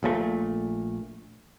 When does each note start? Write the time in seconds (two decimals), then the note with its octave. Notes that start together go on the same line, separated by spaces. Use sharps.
0.03 A#1 A#2 F3 A3